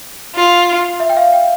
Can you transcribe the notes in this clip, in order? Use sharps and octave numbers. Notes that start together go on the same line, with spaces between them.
F4
E5
G5
F5
G5